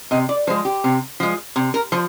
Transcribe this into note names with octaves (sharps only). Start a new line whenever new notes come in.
C3 D#5
D5
F3 G#3 C5
G4
C3
F3 G#3
C3
A#4
F3 C5